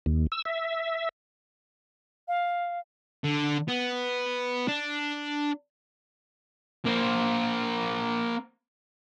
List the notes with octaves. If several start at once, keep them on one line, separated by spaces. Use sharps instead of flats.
D#2
E6
E5
F5
D3
B3
D4
A#3 C5